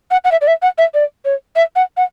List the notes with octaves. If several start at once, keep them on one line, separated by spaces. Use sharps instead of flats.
F#5
F#5
E5
D5
E5
F#5
E5
D5
C#5
E5
F#5
F#5